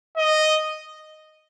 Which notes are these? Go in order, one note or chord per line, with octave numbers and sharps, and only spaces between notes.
D#5